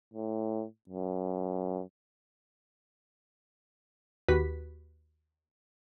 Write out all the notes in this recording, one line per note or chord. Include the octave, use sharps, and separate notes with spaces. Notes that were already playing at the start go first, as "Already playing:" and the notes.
A2
F#2
D#2 F#4 G4 B4 B6